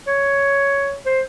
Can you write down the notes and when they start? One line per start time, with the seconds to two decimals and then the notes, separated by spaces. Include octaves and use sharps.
0.07 C#5
1.06 C5